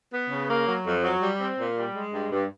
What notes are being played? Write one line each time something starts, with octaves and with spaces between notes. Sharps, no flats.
B3
C#3
A#3
F#3
F2
F#3
G3
C4
A#2
G3
G#3
G2
G2